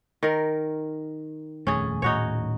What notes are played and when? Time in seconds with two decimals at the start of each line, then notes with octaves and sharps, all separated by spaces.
0.23 D#3 A#4
1.67 D#1 F2 A3 C#4 G#4
2.02 D#1 A2 D#4 F#4 C#5